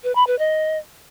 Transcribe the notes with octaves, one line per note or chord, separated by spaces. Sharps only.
B4
B5
B4
D#5